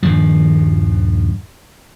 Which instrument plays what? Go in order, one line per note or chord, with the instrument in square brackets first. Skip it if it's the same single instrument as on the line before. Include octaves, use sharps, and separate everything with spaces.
[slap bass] D#1 G2 D#3 F3